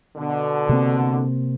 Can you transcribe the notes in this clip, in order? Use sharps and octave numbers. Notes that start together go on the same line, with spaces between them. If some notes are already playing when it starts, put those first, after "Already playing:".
B2 D3
C3 A#3 C4